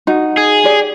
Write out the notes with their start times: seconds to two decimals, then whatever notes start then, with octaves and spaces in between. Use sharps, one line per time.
0.07 D#4 F#4
0.37 G#4
0.64 G4 D5